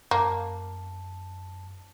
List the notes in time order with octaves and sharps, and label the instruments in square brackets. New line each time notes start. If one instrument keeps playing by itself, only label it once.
[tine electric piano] F#2 A5 [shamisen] A#3